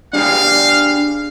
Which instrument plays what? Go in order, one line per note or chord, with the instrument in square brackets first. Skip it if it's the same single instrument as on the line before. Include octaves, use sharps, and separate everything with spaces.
[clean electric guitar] D4 G4 G#4 [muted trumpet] F5